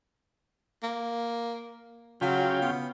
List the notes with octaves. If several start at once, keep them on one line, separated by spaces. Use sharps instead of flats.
A#3
C#3 F#3 F4 G5
B3